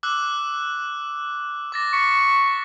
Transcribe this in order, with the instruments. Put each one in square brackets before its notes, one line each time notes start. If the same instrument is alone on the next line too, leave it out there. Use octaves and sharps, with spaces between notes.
[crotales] D6 E6 F#6
D6 A6 A#6
[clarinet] C#6 [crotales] B6